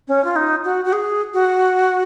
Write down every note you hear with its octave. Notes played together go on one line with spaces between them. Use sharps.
C#4
F4
D#4
F#4
F#4
G#4
F#4